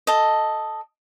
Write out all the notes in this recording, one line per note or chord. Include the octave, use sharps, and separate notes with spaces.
A4 D#5